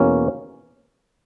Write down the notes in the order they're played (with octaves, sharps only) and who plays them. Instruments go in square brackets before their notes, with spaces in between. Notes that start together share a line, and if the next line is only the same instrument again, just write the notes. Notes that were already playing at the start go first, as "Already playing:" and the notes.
Already playing: [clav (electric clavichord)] E2 B2 A#3 C#4